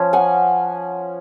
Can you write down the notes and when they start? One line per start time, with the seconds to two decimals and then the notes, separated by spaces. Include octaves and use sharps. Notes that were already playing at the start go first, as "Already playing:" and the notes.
Already playing: F3 C#4 C#5
0.13 F#5 G#5